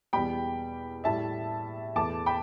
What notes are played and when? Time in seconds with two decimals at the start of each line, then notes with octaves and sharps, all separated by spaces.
0.13 E2 B2 G3 G5 B5
1.04 A2 G3 E5 A5
1.95 E2 B2 A3 A5 D6
2.26 G5 B5